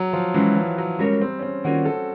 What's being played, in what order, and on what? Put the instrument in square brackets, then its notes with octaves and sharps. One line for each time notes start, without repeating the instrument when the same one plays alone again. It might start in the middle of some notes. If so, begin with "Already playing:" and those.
Already playing: [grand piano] F#3
F3
[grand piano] E3 [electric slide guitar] G#3 C#4 F#4
[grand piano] F3
F#3
[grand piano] G3 [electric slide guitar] G#3 C#4 F#4 A#4 C#5
[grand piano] C4
C#4
C4
[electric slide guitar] D#3 G3 A#3 C#4 F4 [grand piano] F#4
[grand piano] A4